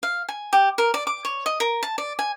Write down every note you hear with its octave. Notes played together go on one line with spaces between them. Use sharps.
F5
G#5
G4
A#4
D5
D6
C#5
D#5
A#4
A5
D5
G#5